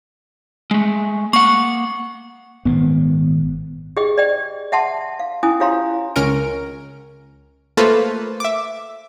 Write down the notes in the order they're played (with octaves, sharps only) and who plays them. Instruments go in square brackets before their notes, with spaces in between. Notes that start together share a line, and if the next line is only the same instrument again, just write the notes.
[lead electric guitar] G#3 A3
[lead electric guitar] A#3 F#5 [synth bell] C#6
[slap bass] G#1 A#2 [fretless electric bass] B3
[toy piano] G4 G#4 D#5 G5
D5 D#5 G5
E5 F#5 A5 C6
F5
C#4 E4 G#5 D#6
F4 G4 C#5 F5 A#5 C6
[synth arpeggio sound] C#2 C#4 A#4 D7
A3 A#3 F4 A4 B4 C5
E5 D6